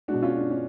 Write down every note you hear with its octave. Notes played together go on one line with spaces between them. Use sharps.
B2 G#3 D4 F#4
C#4 F4
D4
C#4